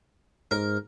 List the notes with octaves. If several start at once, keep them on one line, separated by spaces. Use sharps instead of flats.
G#2 A#4